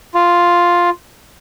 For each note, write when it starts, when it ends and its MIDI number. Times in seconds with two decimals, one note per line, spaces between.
0.15 0.90 65